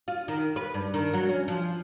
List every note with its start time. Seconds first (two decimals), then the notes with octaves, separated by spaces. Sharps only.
0.08 F4
0.28 D#3
0.56 B4
0.74 G2
0.94 D#3
1.13 F#3
1.29 C#4
1.48 F3